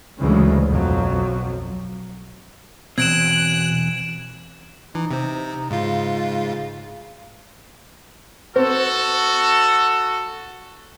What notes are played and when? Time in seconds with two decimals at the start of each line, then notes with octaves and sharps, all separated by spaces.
0.20 D2 C#3 E3 F#3 G#3
0.67 B1 F2 F#3
2.98 E2 B2 C4 F#6 G#6 D7 E7
4.95 E3 D#4
5.11 C3 C4
5.71 G#2 C#3 F4
8.56 C4 F#4 A4